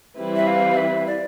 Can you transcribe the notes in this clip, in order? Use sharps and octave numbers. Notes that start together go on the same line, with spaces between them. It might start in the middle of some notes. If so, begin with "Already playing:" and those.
E3 G3 C4 E4 B4
E5
F5
E5
D5